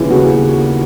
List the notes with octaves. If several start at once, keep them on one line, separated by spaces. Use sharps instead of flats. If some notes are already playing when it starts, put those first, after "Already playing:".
Already playing: D#2 C#3 E3
C#3 F#4